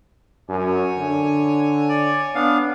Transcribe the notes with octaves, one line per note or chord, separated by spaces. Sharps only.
F#2 C#5 G#5
D3
D5
B3 D4 F5